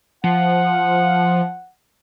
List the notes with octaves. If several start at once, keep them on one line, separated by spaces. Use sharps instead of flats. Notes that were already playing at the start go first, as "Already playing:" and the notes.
F3 F#5